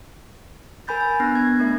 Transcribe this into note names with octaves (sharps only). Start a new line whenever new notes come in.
A#4 G#5 B5 G6 A6
G#5
B3 D4 F#6 A#6
G#6
A3 D4 A#4 E5